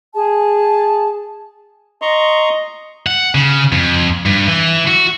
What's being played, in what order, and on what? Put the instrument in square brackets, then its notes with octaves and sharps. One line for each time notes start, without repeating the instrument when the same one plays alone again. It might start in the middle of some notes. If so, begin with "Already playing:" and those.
[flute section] G#4 A5
[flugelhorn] D#5 [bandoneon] A#5 C6 C#6
[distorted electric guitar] F#5
C#3
F2
G2
E3
F#4